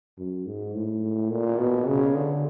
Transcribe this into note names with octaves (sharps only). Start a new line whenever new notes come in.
F#2
G#2
A2
A#2
B2
C#3
D3